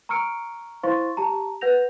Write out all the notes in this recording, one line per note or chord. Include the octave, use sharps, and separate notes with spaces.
A#5 C#6 E6 F6 C#7 D7
E4 C5 F5 C6 C#6 A6
G4 A5 A#5
B4 F#5 G6 A#6 F7